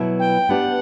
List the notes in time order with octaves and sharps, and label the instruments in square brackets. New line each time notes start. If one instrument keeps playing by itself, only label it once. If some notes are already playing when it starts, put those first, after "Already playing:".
Already playing: [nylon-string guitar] B2 F#3 B3 E4
[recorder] G5
[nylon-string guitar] B3 D4 G4 [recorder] F#5